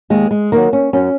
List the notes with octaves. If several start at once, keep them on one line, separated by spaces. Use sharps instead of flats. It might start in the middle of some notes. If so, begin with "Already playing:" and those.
D#2 G#3
G#3
D#3 F#3 A#3
C#4
F#2 C#4